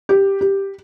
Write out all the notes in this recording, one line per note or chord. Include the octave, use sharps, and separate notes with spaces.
G4
G4